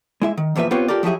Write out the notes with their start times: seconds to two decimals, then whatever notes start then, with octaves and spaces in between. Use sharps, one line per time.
0.22 G#3 E4 E5
0.37 D#3
0.56 E2 A#2 F3 B4 E5
0.71 B3 C4 F4 G4 B4 C#5
0.88 F4 G4 A4 A#4 D5
1.03 F3 F#3 E4 G4 G#4 E5